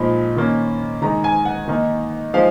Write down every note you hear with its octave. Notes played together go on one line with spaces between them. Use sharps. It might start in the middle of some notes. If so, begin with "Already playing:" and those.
Already playing: A#2 F3 G#3 D#4 B5
D#3 A#3 C#4
D#3 G#3 D#4 A#5
G#5
F#5
D#3 A#3 D#4
F3 G#3 D#4 F5